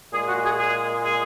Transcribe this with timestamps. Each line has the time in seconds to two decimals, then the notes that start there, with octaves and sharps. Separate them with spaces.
0.13 A#2 G#3 G#4
0.28 F#4
0.44 G#4
0.58 G#4
1.04 G#4